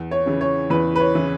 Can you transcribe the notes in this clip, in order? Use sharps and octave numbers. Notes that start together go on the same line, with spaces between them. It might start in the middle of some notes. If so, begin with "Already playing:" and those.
Already playing: E2
C#5
C#3 E3
C#5
E2 B4
B4
C#5
C#3 E3